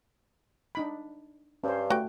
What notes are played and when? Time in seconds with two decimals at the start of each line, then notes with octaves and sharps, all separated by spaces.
0.75 D4 D#4 B5
1.64 G2 C#4 C5
1.90 A3 F#4 G5